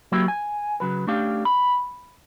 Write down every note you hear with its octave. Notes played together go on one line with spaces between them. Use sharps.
F#3 A#3 E4 F#4 G4
G#5
C#3 F#3 B4
A3 C#4 D4 G4 F5
B5